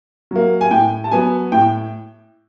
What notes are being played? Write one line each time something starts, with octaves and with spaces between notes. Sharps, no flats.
F#3 A#3
G#5
A2 G5
A5
F#3 B3 G#5
A2 G5